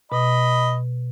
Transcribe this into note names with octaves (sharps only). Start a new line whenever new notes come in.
B2 D#5 B5